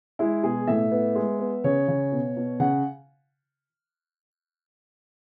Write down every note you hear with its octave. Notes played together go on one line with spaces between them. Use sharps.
G#3 E4
B2 G#4
A2 E5
B3
G#3
B3
C#3 C#5
C#3
B2
B2
C#3 F#5